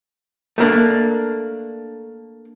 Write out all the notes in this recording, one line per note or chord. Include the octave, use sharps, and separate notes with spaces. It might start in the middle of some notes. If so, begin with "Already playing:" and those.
A3 A#3 D4